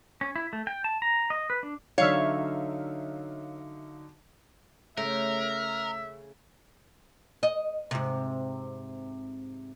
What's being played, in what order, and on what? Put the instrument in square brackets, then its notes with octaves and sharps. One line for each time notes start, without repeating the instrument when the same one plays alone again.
[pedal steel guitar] C#4
E4
A3
G5
A5
A#5
D#5
B4
D4
[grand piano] D3 F#3 D#4 [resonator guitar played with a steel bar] C#5 [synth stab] E5 F5
[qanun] C#3 [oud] A3 [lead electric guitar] A#4 [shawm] E5
[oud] D#5
G#2 C3